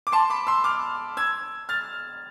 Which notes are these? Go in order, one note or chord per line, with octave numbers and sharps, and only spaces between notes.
D6
A5 C6
B5 D6
C6 E6
D6 F6
E6 G#6
F6 A6